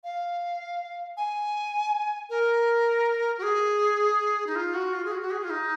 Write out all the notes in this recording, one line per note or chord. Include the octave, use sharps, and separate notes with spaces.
F5
G#5
A#4
F#4
G#4
D#4
F4
F#4
F4
G#4
F#4
F#4
G#4
F4
D#4